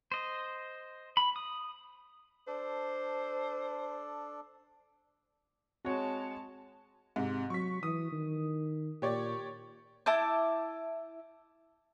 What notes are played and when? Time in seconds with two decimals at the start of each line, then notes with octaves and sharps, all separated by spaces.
0.12 C5 D#5
1.17 B5
1.36 D#6
2.47 D4 A4 C5 D5
5.85 G#3 C4 F#4 C#5 A5
7.16 G#2 C3
7.50 F#3 C#6 B6
7.83 E3 D#6
8.12 D#3
9.02 A#2 G4 C#5 D5
10.06 E4 A5 D6 G6